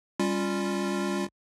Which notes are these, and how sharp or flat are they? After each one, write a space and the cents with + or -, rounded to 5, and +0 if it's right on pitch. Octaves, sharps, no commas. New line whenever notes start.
G3 +20 C#4 +0 F4 +0